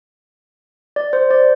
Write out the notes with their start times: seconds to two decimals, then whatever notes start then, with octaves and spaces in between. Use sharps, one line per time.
0.96 D5
1.13 C5
1.30 D5